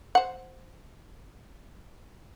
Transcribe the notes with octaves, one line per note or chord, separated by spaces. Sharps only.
C5 F#5